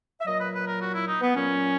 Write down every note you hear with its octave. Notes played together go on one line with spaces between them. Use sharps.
E5
A#2 F#3 D#5
B4
B4
A#4
F#4
E4
D#4
B3
A#2 F#3 C#4